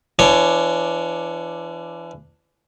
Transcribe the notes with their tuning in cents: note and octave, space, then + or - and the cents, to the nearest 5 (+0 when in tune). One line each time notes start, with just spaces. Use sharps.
E3 +35 D4 +0 C#5 +0